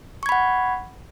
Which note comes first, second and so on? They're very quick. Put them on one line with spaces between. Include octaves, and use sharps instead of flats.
C#6 G#6 B5 F#5